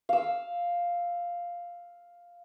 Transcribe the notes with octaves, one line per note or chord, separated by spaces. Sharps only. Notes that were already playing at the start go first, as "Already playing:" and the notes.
F5 E6